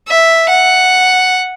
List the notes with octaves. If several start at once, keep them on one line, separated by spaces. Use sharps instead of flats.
E5
F#5